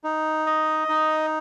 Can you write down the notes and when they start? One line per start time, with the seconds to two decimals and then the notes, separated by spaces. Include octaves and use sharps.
0.04 D#4
0.46 D#5
0.89 D#4